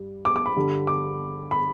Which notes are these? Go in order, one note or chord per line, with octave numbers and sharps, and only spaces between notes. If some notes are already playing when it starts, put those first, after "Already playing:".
Already playing: G2 G3
D6
D6
B5
G2 D3 G3
D6
B5